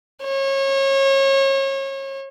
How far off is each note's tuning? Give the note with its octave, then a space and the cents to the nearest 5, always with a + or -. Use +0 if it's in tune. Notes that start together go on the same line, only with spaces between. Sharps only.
C#5 -30